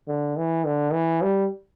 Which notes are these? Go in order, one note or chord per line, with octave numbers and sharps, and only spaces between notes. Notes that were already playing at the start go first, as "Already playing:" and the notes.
D3
E3
D3
E3
G3